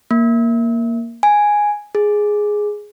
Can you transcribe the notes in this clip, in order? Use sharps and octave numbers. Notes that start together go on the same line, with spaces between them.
A#3
G#5
G#4